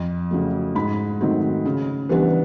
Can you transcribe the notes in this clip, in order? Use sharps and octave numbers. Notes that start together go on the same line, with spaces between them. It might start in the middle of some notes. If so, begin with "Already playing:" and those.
Already playing: F2
C#3 F#3 A3
G#2 B5
D#3 F#3 A3 C4
C#3
E3 G3 B3 D4